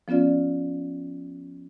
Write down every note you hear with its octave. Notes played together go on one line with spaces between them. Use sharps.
F3 B3 C#4 F4 D5